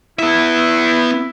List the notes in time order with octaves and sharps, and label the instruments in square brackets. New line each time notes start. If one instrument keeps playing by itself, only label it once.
[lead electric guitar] B3 E5 [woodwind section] E4